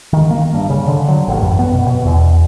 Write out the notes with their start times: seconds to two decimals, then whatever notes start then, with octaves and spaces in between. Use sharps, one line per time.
0.13 D#3
0.31 A#3
0.54 G2
0.70 C#3
0.88 D3
1.08 F#3
1.28 A1
1.43 F#2
1.59 B3
1.74 B2
1.86 B2
2.05 E2